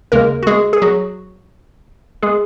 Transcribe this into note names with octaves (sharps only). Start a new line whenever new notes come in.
D#2 C#3 G#3 A#3 A#4
F#4
G#3 G#4
G#4
F#3 F#4
G#3 G#4